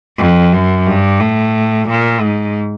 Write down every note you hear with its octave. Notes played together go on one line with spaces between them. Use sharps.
F2
F#2
G2
A2
A#2
G#2